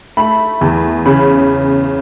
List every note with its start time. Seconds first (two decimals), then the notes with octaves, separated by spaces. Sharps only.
0.17 A3 B5
0.61 E2
1.06 C#3 B5